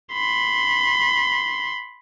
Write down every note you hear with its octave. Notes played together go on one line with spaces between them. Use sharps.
B5 C6